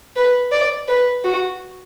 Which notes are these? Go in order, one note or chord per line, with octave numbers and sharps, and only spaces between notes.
B4
D5
B4
F#4